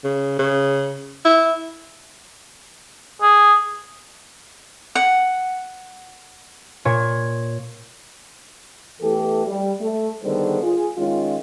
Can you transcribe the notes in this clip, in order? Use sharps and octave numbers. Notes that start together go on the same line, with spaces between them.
C#3
C#3
E4
G#4
F#5
A#2 C#5 G#6
E2 E3 A3 G4 A4
G3
A3
D3 D#3 G3 B3 G#4 C5
F4 G#4
D#3 G#3 C#4 F4